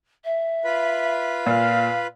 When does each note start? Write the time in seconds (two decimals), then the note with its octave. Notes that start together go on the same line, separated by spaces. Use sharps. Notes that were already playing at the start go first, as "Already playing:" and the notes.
0.25 E5
0.65 F4 B4 B5
1.46 A#2 F5